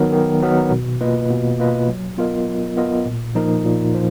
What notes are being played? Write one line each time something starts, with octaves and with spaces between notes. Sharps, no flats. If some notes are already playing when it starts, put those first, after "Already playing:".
Already playing: D#3 F#3 B3 D#4 A#4
D#3
F#3 B3 D#4 A#4
B2
A#3 F4 B4 D#5
B2
A#3 F4 B4 D#5
F#3
B3 F4 A#4 D#5
F#3
B3 F4 A#4 D#5
A#2
F3 A#3 D#4 A#4
A#2
F3